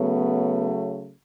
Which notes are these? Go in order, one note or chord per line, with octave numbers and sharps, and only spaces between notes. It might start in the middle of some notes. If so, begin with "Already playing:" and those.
Already playing: C#3 F#3 A3 B3